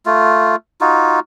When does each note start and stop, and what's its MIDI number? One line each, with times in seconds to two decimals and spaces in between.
0.06 0.56 57
0.06 0.56 65
0.81 1.20 63
0.81 1.20 65
0.81 1.20 66